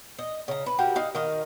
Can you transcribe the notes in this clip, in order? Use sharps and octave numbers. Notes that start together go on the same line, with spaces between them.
D#5
C#3 A#5
B4
F#4 G4 A#4
D#4 F5 F#5
D#3 A#4 D#5 F5